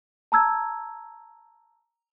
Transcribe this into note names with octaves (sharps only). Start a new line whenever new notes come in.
A5 A#5 E6 G#6